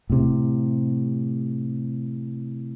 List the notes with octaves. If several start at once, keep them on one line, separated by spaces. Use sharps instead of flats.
A2 C3